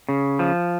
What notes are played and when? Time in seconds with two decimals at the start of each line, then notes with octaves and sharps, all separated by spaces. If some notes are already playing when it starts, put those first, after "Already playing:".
0.09 C#3
0.39 F3